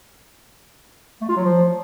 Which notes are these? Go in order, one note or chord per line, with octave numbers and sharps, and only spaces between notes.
A3
F4
F#3
F3